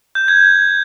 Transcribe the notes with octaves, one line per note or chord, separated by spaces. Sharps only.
G6
G#6